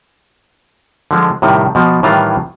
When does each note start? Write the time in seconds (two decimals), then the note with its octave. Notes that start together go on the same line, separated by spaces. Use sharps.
1.11 D3 F3 G#3
1.42 A2 C3 D#3 G3
1.75 B2 F3
2.03 A2 D#3 E3 G3 F4 A#5